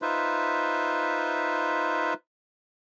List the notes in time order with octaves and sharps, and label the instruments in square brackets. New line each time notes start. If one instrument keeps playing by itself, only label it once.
[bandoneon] D#4 F4 B4 C5 E5